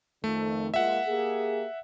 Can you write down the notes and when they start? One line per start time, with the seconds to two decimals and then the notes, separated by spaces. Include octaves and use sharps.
0.24 F2 D#3 A3
0.74 G#3 A#3 F4 E5 F#5
1.08 A#3 G4 G#4